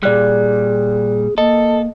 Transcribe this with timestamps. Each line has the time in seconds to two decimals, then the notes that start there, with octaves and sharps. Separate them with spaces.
0.03 A#2 G3 G#4 D5 F#6
1.38 A#3 A4 D#5